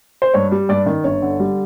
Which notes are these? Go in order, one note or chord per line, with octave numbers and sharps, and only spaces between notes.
C5
G2 C#5
G3
G2 D5
D#3
G1 C#5
D3
G3